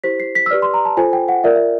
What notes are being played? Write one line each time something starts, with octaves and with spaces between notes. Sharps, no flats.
E4 G4 C5 B6
C7
B6
E6
G4 B4 D5 F6
C6
A#5
A5
F4 A4 C5 G#5
G5
F#5
F4 A#4 D5 E5
E5